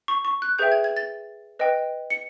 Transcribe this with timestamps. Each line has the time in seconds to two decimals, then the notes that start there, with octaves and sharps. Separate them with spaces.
0.08 C#6
0.25 C#6
0.42 F#6
0.58 G#4 B4 E5 G5 G6
0.72 G#6
0.84 G#6
0.97 A6
1.59 B4 D#5 G5
2.10 C#7